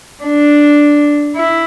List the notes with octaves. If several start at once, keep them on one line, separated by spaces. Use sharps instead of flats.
D4
E4